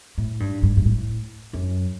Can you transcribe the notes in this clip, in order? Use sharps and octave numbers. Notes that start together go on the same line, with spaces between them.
A2
G2
G2
G2
A2
F#2